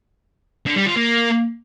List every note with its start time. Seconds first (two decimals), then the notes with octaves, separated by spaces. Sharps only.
0.66 D3
0.76 G3
0.86 F4
0.96 A#3